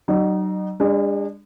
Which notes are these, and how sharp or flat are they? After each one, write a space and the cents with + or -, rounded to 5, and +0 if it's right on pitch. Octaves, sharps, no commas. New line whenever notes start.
F#3 +35 D#4 -35
G#3 -40 D4 +0